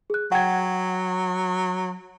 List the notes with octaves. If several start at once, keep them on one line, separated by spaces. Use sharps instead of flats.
G#4 F#6
F#3 F#5 G5 G#6